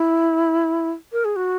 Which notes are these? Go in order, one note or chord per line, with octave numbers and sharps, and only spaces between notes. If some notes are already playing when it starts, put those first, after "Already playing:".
Already playing: E4
A#4
G#4
F#4